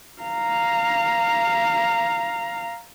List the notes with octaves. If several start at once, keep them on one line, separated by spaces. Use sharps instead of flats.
F5 A#5